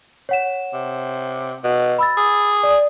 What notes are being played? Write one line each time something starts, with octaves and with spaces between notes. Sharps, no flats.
C#5 F#5 E7
C3
B2
B5 E6 A6
G#4
D5